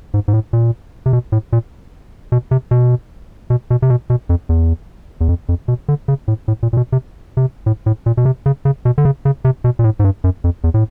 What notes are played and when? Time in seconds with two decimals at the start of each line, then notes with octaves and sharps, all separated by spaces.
0.14 G#2
0.28 G#2
0.34 A2
0.53 A#2
1.06 C3
1.13 B2
1.32 A2
1.53 A#2
2.32 B2
2.51 C3
2.71 B2
3.50 B2
3.70 B2
3.82 C3
3.90 B2
4.10 B2
4.29 F2
4.49 E2
5.21 E2
5.28 F2
5.49 F2
5.68 B2
5.89 D3
6.08 C#3
6.28 A2
6.48 A2
6.63 A#2
6.73 A#2
6.77 B2
6.92 C3
7.37 C3
7.66 A2
7.86 A2
8.06 A#2
8.17 B2
8.25 C3
8.46 C#3
8.65 C#3
8.85 B2
8.98 D3
9.05 C#3
9.25 C#3
9.45 C3
9.64 B2
9.79 A#2
9.84 A2
10.00 G#2
10.04 G2
10.24 F#2
10.44 F2
10.64 E2
10.74 A2